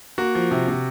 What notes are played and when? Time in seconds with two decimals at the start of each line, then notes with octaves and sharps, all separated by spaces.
0.18 A#3 F#4
0.35 F3
0.51 C3
0.68 C3